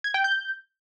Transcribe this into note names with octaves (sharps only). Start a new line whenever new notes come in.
G#6
G5
G6